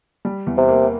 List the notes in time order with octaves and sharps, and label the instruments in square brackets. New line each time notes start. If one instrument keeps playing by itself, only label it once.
[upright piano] G3
E2
[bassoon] C3
[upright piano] A#3